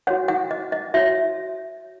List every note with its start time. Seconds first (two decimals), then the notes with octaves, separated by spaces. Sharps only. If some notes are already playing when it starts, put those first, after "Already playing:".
0.07 F#4 C#5 F#5
0.28 F#5
0.51 D#5
0.72 D#5
0.94 F#4 C#5 E5